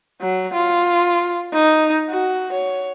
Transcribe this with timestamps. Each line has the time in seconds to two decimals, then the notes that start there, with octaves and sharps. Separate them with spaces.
0.21 F#3
0.54 F4
1.53 D#4
2.09 F#4
2.52 C#5